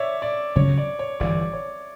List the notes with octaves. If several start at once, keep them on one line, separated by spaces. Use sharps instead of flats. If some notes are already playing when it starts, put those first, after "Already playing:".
Already playing: C#5 D5 E5
D5
D2 C#3 F#3 C#4 C#5
D5
C#5
G1 G2 E3 D5
C#5